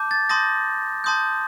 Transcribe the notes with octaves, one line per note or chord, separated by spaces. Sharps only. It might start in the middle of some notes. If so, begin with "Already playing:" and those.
Already playing: A5 D6 G6
A6
A5 C6 D#6 G6 A#6
A5 C6 D#6 G6